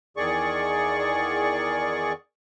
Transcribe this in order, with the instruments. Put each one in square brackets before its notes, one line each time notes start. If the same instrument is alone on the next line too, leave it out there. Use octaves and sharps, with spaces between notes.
[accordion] E2 D#3 G#4 D5 C#6